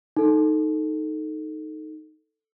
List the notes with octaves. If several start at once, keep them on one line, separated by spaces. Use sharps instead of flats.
D#4 A4